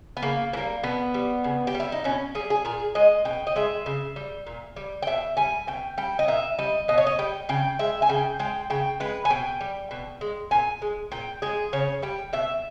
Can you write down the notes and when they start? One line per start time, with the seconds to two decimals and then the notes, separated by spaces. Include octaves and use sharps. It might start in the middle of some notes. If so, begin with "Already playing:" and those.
0.17 B3
0.22 C#3 A#3
0.53 E3 G3 A#3
0.83 B2 B3
1.14 G3
1.44 C#3
1.67 G4
1.74 G3
1.80 E4
1.92 D#4
2.04 B2 C#4
2.35 G3 G#4
2.50 G#4
2.65 A#2 G#4
2.95 G#3 D#5
3.25 B2 G5
3.47 D#5
3.56 G#3 E5
3.86 C#3
4.16 G3
4.47 A#2
4.76 G3
5.02 G5
5.07 B2 E5
5.37 G3 G#5
5.67 B2 G5
5.97 G3 G5
6.19 D#5
6.28 A#2 E5
6.58 G3 D#5
6.88 B2 D#5
6.98 C#5
7.07 D#5
7.19 G3 G5
7.49 C#3 G5
7.79 G#3 E5
8.02 G#5
8.09 C#3 G5
8.39 G#3 G5
8.70 C#3 G5
9.00 G#3 B4
9.25 G#5
9.30 B2 G5
9.61 G3
9.91 B2
10.21 G#3
10.51 A#2 G#5
10.82 G#3
11.12 A#2 G5
11.42 G#3 G#4
11.73 C#3 C#5
12.02 G3 G5
12.33 B2 E5